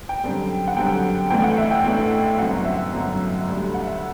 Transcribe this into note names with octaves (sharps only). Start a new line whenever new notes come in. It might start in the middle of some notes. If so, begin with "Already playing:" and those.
G5
F#2 D3 G3 C4
F#5
F#2 D3 G3 C4 G5
A1 A2 E3 A3 D4 G5
F#5
E5
G5
A1 A2 E3 A3 D4
G1 F#2 D3 F#3 C4 F#5
E5
G1 F#2 D3 F#3 C4
D2 D3 G3
F#5
E5